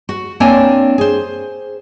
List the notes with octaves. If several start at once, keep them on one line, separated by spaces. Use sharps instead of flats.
F#4
A#3 C4 D4 C#5 G#5
G#4 C5